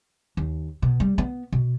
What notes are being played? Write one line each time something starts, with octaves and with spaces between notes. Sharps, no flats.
D#2
B2
G3
B3
B2